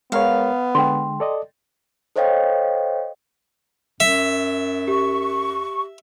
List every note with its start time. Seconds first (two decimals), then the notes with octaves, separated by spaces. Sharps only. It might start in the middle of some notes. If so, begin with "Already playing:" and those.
0.12 G#3 B3 A#4 C#5 F5
0.75 D3 G#3 G5 C6
1.20 A4 D5 D#5
2.16 A4 C5 C#5 D#5 F5 G5
4.00 F#2 E5
4.88 G4 C#6